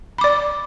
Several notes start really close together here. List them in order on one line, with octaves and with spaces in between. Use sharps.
B5 D6 D5